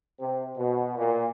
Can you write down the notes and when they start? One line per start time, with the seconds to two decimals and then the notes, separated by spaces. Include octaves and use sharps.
0.20 C3
0.57 B2
0.96 A#2